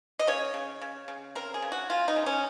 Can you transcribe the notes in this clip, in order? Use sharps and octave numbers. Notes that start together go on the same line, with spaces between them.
D#5
C#3 C#5
C#3
C#3
C#3
C4 A#4
G#4
C#3
F#4
C#3 F4
D#4
C#3
C#4